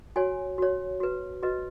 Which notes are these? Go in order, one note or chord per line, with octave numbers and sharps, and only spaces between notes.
F#4 C#5 G#5
F#4 C#5
F#4 B4
F#4 B4 D#5